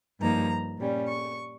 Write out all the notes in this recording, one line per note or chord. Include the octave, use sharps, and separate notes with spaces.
G2 F3 A#3 D#4 A#5
A#2 G3 C#4
C#6